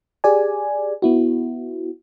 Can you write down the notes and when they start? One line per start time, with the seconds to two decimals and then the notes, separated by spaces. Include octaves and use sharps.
0.24 G4 G#4 D5 G#5
1.02 B3 E4 F#4